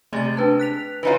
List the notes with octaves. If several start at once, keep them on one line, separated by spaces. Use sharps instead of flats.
C3 G#3 A3 A6
D4 B4 A5
F#6 B6 F7
E3 D#4 F4 B4 C#5